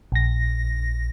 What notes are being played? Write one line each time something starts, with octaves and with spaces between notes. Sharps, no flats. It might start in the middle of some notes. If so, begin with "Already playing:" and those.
A#1 A#6